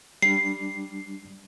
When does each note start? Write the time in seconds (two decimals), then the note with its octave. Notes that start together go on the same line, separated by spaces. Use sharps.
0.22 G3 D4 C7